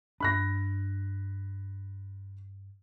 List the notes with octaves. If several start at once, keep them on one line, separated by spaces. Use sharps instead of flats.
G2 D4 B5 F#6 A#6